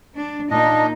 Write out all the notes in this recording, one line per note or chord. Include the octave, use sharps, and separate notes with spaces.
D4
A#2 A#3 D4 D#4 D#5